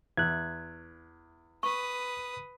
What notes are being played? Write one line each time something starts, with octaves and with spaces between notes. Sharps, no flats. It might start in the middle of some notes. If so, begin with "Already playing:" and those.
E2 E5 F#6 G#6
B4 C#6 D#6